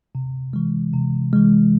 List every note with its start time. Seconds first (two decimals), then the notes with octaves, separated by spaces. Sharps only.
0.15 C3
0.53 E3 G#3
0.93 C3
1.33 E3 G#3